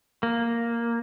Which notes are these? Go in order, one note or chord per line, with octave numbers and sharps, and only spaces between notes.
A#3